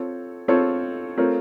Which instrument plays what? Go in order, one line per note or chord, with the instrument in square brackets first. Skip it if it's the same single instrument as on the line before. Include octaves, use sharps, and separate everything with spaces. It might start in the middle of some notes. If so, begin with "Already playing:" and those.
Already playing: [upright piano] C4 F4 A4 C#5
C4 F4 A4 C#5
A3 C4 F4 A#4 C#5